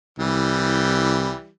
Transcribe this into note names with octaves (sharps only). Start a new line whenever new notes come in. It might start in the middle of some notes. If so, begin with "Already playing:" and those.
C2 E3 G3